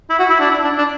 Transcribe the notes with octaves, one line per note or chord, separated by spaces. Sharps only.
E4
F#4
E4
D4
E4
D4
D4